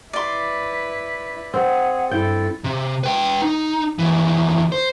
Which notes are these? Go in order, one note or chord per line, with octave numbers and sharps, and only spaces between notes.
E4 B4 D5 C6
C4 G#4 F#5
G2 E4 A4 G5
C3
B4 G5
D#4
D#2 E3
C5